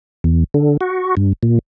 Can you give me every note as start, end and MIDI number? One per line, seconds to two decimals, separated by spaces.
0.24 0.44 40
0.54 0.77 50
0.81 1.15 66
1.17 1.33 43
1.43 1.59 46